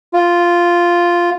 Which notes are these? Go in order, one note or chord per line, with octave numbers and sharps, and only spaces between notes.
F4